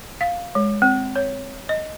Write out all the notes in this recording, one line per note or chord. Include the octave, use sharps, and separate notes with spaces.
F5
G#3
C4
C#5
D#5